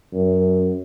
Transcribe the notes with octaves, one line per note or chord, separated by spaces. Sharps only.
F#2